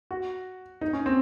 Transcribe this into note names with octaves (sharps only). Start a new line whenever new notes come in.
F#4
D#4
C#4
C4